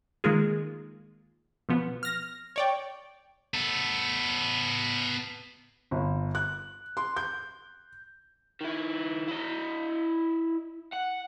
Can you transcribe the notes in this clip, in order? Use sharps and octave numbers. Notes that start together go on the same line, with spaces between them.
D#3 G#3 A#3 F4 G#4
B2 F3 B3
F6 A#6
C#5 D5 G5
B3 A4
G1
F#6
C6
G6
D#3 E4
E4 D#5
F#5